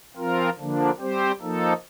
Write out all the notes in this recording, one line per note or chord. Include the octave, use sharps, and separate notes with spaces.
F3 C4 F4 A#4
D3 F3 A#3 D4
G3 C4 G4 C5
F3 A#3 D#4 A4